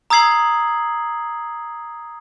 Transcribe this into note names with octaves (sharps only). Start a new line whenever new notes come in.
A#5 D#6 E6 G#6 C7 F#7